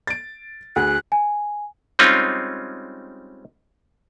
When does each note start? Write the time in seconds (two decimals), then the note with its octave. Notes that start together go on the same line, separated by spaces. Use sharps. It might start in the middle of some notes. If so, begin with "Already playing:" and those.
0.07 A6 D7
0.76 D2 G#4 F#6
1.12 G#5
1.99 G3 G#3 C4 C#4 D#4 F4